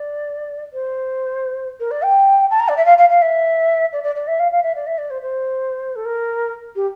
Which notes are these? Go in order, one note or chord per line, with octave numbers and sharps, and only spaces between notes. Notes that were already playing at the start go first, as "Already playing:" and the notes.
Already playing: D5
C5
A#4
D5
G5
A5
A#5
D5
E5
F5
F5
F5
E5
D5
D5
D5
E5
F5
F5
E5
D5
E5
D5
C5
C5
A4
A#4
G4